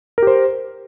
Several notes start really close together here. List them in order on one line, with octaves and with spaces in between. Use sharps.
A#4 G4 C5